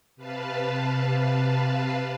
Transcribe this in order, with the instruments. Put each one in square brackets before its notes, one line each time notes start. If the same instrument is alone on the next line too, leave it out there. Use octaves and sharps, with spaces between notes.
[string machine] C3 B4 F5 A5